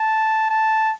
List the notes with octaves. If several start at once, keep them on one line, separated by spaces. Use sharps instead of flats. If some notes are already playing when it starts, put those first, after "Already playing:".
Already playing: A5
A5